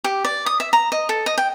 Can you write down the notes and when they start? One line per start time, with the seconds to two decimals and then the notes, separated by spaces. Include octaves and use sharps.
0.04 G4
0.25 D5
0.46 D#6
0.60 E5
0.73 A#5
0.92 D#5
1.09 A4
1.26 D#5
1.38 G5